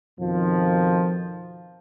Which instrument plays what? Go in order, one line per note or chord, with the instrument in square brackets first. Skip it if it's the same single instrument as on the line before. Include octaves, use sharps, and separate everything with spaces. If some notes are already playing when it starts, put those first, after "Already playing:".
[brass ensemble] F2 B2 D#3 F3